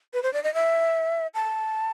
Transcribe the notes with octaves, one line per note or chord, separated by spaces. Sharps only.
B4
C5
D5
D#5
E5
A5